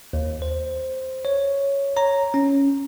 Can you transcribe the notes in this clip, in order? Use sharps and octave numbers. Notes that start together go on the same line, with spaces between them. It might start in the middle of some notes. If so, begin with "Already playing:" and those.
D#2
C5
C#5
C#5 A#5
C#4